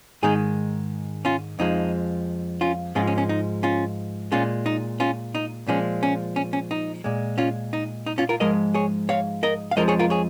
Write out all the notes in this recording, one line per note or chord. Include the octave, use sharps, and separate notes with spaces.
G#2 D#3 G#3 D#4 G#4
C#4 F4
F2 F3 G#3 D#4
C#4 F4
G#2 F3 G#3 C#4 F4
C#4
C#4
D#4
C#4 F4
A#2 G#3 C#4 F4
D#4
C#4 F4
D#4
A#2 F3 G#3 C#4
C#4
C#4
C#4
D#4
A#2 G#3
C#4 F4
D#4
D#4
C#4 F4
F4 A#4
G#2 F3 G#3 A#4 D#5
G#4 C#5
C#5 F5
A#4 D#5
F5
F2 C#3 F3 G#3 A#4 D#5
G#4 C#5
F4 A#4
G#4 C#5